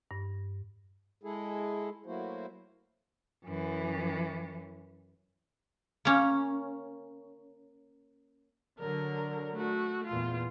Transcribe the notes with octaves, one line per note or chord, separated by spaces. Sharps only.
G2
G#3 E4 G#4 A4
F#3 A3 A#3 E4 F#4 C5
F#2 E3
A#3 C#4
D3 F#3 A#4
A3 F#4
E2 A#2 F4